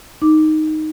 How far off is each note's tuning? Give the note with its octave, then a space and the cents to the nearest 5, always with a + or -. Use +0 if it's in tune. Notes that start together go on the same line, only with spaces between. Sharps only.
D#4 +0 D6 +0